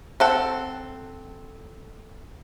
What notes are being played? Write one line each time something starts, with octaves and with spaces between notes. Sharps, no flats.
C4 A4 F#5